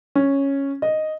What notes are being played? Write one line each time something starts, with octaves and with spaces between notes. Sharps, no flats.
C#4
D#5